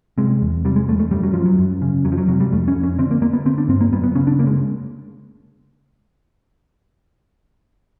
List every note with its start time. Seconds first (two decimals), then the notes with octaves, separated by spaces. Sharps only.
0.18 C3 G#3
0.42 E2
0.65 C3 G3
0.76 G#3
0.88 E2 A3
0.99 A3
1.11 F#2 G3
1.23 F#3
1.34 F#2 F3
1.46 F#3
1.58 F#2
1.82 C#3
2.05 F2 F#3
2.12 F3
2.18 F#3
2.28 C3 F#3
2.40 G3
2.52 F2 A3
2.68 C#4
2.76 F2
2.83 C#4
2.98 D3 C4
3.11 A#3
3.22 D3 A#3
3.33 B3
3.46 D3 C4
3.58 D4
3.68 G2 C4
3.81 A#3
3.92 F#2 B3
4.03 B3
4.15 C#3 C#4
4.27 D4
4.39 C#3 A#3
4.47 G#3